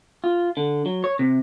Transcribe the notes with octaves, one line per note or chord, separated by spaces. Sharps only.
F4
D3
F#3
C#5
C3